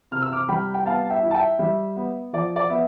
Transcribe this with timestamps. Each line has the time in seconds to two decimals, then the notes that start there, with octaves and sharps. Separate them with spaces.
0.11 C3 F6
0.22 E6
0.32 D6 F6
0.48 G3 G5 B5
0.74 G5
0.86 B3 F5 A5
1.10 E5 G5
1.23 E4
1.31 A5
1.34 E5 G5
1.59 G3 E5
1.96 B3
2.33 F3 D5
2.56 D5
2.70 B3 E5